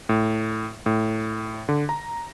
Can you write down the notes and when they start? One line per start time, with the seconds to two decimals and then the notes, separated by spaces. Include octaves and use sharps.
0.09 A2
0.86 A2
1.69 D3
1.89 A#5